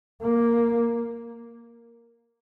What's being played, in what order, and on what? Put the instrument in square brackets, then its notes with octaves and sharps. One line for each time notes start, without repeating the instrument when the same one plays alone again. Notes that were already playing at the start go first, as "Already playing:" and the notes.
[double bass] A#3